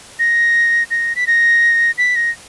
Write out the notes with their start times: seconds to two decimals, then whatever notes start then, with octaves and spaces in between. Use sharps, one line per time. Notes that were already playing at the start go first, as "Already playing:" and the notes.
0.19 A#6
0.91 A#6
1.16 B6
1.27 A#6
1.98 B6
2.16 A#6